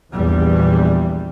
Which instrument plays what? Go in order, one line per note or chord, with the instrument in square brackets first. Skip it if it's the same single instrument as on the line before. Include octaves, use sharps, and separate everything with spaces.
[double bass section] A#1 E2 E3 G3